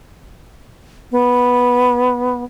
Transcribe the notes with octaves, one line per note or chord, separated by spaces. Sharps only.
B3